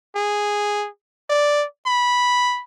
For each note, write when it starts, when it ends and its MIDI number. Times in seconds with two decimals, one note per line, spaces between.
0.15 0.88 68
1.30 1.65 74
1.86 2.62 83